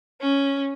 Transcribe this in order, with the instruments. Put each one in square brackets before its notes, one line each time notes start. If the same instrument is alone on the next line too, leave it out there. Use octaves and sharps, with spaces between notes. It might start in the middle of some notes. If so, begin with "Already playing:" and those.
[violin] C#4